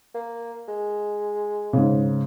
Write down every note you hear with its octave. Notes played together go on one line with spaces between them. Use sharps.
A#3
G#3
G#2 C#3